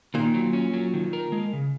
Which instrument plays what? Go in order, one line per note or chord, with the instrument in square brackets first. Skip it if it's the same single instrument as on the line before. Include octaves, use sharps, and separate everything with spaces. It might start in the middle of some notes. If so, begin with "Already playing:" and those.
[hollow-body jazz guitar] A#2 [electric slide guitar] D#3
[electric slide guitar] F#3
C#4
F#3
D#3
A#4
G#3
C#3